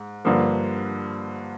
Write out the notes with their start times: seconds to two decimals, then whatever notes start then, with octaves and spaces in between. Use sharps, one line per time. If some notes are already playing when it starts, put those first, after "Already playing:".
Already playing: G#2
0.25 G2 D3 F3 A#3